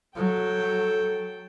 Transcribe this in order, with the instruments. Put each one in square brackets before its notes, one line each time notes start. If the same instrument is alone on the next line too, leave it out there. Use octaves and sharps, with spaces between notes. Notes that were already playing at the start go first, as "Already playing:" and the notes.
[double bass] F#3 [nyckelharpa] A4 G5